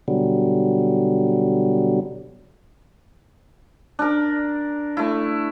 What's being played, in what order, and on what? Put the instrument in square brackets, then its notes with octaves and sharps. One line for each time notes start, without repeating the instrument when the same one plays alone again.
[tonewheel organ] B2 D3 F#3 G3
[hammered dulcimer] D4 A#4
A3 E4